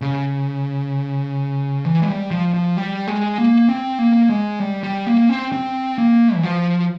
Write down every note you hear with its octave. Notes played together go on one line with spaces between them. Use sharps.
C#3
E3
G#3
G3
F3
F3
G3
G#3
A#3
C4
A#3
G#3
G3
G3
A#3
C4
C4
A#3
E3
F3